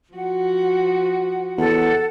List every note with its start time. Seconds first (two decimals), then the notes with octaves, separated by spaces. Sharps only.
0.14 F3 F#4 F#5
1.58 E2 A4 F#5